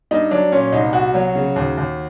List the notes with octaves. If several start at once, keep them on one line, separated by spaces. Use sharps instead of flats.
G2 D#4
F#3 D4
A#2 C#4
C2 D#4
C2 F#4
F#3
C#3
D#2
D#2